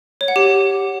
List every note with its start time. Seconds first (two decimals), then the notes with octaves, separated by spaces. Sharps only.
0.21 C#5
0.28 F#5
0.36 G4